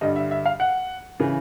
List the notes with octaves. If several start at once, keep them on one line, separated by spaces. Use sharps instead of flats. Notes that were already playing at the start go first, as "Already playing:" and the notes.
G2 D3 G3 D#5
E5
E5
F5
F#5
C#3 E3